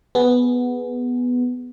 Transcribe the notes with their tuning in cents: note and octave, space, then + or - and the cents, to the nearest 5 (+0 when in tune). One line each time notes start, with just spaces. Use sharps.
B3 +0 G#4 +0